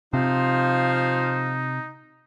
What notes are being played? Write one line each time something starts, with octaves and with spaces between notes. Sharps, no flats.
C3 F3 D#4 C5 F5